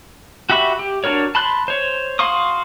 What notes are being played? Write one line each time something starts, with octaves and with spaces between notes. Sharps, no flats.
F#4 G4 E5 B5 C#6
G4
D4 F#4 A#4 C#5
A5 B5 C6 F#6
C5 C#5
F#4 F5 C6 C#6 D#6